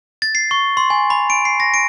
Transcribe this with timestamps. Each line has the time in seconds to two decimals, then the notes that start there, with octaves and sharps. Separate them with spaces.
0.22 A6
0.35 C7
0.51 C#6
0.77 C6
0.90 G#5
1.10 B5
1.30 D7
1.45 C7
1.60 A#6
1.74 D7